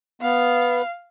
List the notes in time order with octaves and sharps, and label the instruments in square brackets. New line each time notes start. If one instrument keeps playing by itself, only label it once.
[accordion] B3 [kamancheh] F5